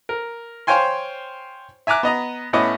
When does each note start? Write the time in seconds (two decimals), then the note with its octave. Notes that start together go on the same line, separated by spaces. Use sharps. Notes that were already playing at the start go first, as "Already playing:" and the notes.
0.09 A#4
0.67 C5 C#5 F5 G5 G#5 C6
1.87 E5 G#5 A#5 D6 F#6
2.03 B3 D#5 A#5
2.53 A2 B3 C#4 E4 D#5 D6